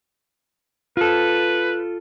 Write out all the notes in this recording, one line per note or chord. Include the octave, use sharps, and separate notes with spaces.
F4 A4 B4